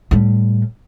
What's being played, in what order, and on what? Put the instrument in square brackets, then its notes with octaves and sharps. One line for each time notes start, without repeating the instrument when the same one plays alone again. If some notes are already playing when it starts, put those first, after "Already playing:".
[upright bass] A2 G3